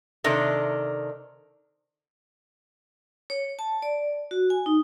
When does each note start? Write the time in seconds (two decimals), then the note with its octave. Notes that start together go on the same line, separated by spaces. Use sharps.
0.24 C3 D#3 D4 A4
3.30 C#5
3.59 A5
3.82 D5
4.31 F#4
4.50 G#5
4.66 D#4